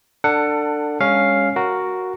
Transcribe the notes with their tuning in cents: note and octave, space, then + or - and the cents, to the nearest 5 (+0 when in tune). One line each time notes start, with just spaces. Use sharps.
D4 +15 A4 +30 F#5 +0
G#3 -45 C#4 +0 F5 +0
F#4 +0 A#4 +0